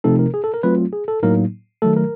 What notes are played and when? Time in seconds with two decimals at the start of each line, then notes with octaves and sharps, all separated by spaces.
0.04 C3 F3 A3 C4 D#4 A4
0.19 A#4
0.34 G#4
0.44 A4
0.54 A#4
0.63 F#3 A3 C4 F4 B4
0.93 G#4
1.08 A4
1.23 A2 F#3 A#3 D#4 A#4
1.82 D#3 F#3 A3 A4
1.97 A#4